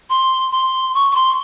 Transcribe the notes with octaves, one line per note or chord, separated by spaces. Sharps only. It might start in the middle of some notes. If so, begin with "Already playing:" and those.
C6
C6
C#6
C#6
C6